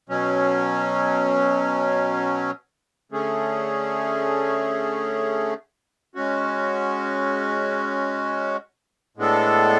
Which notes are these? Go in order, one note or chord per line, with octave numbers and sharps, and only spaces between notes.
B2 F#3 C#4
D3 A3 C#4 G#4
G#3 C#4 F#4
A2 G#3 B3 D4 A4